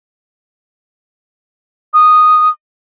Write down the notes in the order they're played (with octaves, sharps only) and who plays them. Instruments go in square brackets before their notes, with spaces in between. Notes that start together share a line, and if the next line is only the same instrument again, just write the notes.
[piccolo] D#6